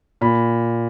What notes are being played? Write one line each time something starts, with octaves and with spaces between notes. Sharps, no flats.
A#2 B5